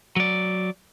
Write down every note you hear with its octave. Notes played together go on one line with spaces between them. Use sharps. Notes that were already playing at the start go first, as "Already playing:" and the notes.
F#3 D5